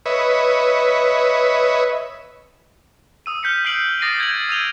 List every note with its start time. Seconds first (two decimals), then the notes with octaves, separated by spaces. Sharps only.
0.06 B4 C#5 D#5 E5
3.26 D#6 E6 D#7
3.43 F6 G6 B6 C#7
3.65 F6 C7 D7 F#7
4.01 D6 D#6 A6 A#6 C7 D#7
4.19 G6 G#6 D7 F#7
4.49 E6 D#7 F7 G7